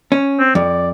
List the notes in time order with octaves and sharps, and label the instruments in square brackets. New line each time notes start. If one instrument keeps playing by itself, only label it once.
[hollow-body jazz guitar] C#4
[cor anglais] C4
[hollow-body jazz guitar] F2 [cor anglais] D5